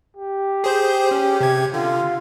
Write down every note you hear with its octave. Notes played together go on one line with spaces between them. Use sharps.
G4
G#4 C5 G6
C#4
C3 G#6
D3 F4